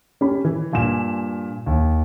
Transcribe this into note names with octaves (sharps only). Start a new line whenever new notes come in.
C#4 G4 B5
E3
G2 A#2 G#5 E7
D#2